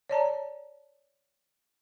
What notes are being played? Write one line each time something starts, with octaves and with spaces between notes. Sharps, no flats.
C#5 D5 A5 A#5